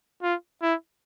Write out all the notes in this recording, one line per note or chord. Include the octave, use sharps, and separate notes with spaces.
F4
E4